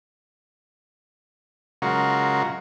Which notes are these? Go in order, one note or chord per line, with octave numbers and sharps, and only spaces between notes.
C#3 F#3 G#3 F4 F#4 A#4